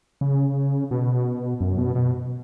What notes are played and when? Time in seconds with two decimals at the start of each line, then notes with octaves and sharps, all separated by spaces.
0.21 C#3
0.91 B2
1.60 F#2
1.78 B2
1.95 B2